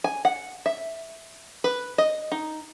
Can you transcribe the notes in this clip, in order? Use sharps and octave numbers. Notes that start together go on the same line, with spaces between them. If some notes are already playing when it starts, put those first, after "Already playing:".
G#5
F#5
E5
B4
D#5
D#4